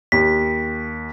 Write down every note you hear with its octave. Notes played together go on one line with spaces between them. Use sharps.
D#2 B6